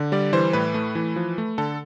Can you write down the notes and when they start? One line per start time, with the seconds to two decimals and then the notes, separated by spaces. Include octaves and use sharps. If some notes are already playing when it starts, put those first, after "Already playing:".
Already playing: D3
0.12 G3 D5
0.33 E3 C5
0.53 A2 B4
0.74 A3
0.95 E3
1.16 F3
1.38 A3
1.58 D3 A4